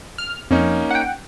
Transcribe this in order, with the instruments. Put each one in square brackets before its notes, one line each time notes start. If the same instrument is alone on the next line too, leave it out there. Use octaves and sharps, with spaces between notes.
[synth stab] F6
[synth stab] F2 [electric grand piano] A#3 C#4 D#4
[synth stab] F#5 G5